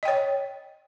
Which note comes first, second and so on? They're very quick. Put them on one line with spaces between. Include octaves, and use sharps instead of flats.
D#5 G5 C#5